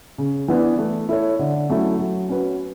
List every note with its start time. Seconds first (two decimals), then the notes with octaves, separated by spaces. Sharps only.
0.18 C#3
0.48 E3 B3 D4
0.78 A3
1.09 E4 A4 C#5
1.39 D3
1.69 F#3 A3 C#4 E4
1.99 F#3
2.29 C#4 F#4 B4